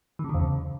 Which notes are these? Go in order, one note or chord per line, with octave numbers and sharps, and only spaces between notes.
D#3
C#3
D3
E2
C#3